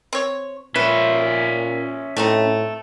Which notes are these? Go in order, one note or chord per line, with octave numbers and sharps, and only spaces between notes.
C4 C#5
A#2 C#4 B4 E5
A2 A3 C4 D#4